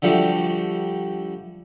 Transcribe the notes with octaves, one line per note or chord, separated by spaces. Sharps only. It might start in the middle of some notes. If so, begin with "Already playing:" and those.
D3 F3 G3 A3 F#4